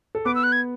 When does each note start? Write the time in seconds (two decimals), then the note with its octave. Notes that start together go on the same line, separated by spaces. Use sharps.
0.15 A4
0.25 B3 B4 D6
0.35 E6
0.44 F#6
0.52 G#6